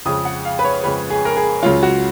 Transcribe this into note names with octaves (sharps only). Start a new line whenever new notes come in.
F2 C#3 G#3 D#6
F#5
F5
B4
C#5
F2 C#3 G#3 B4
G#4
A#4
G#4
C#2 C#3 F#3 F4
F#4